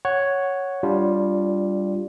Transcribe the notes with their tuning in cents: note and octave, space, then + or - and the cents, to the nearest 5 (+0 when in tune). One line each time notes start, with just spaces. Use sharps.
C#5 +0 F#5 +0
G3 +0 D4 -20 F4 +0